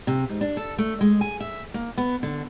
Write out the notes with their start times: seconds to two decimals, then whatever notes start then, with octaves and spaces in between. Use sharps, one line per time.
0.07 C3
0.29 G#2
0.41 D4
0.57 A4
0.78 A3
1.01 G#3
1.21 G#5
1.40 E5
1.74 A#3
1.98 B3
2.23 D3